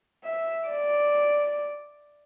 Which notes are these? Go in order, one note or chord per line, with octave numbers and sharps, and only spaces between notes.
E5
D5